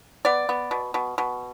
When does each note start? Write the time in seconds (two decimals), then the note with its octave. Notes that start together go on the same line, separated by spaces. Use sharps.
0.25 B3 D5
0.49 B3
0.71 B2
0.94 B2
1.18 B2